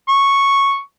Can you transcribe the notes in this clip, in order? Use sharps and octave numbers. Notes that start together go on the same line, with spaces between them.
C#6